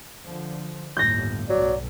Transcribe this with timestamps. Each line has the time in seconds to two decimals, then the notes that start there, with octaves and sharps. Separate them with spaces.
0.23 D3 F3
0.97 G1 D#2 A2 G6 A#6
1.49 B1 F#3 D5